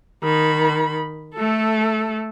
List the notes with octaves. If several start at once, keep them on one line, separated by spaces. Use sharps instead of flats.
D#3 B5
A3 A4